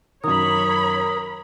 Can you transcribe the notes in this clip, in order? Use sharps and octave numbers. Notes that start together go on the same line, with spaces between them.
F#2 D#3 A#4 C#5 B5 D#6